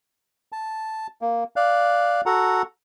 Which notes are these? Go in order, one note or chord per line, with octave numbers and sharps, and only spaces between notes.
A5
A#3
D5 F5 F#6
F#4 A4 F#5 A#5